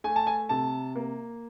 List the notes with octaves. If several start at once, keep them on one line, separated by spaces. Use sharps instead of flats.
A3 G#5
A5
G#5
C3 A5
A#3